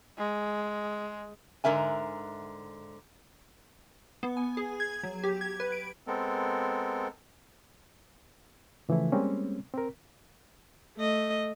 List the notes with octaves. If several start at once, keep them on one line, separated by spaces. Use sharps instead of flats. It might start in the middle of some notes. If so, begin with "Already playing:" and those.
G#3
G#2 D3 A#3 A#4 E5 G#5
B3
G#5
G#4
G#6
F#3
G4
G#6
B4
D7
G#3 B3 C4 A4 A#4
C#3 E3 F3 A3 E4
G3 G#3 A#3 C4 C#4
C4 A#4
A3 D#5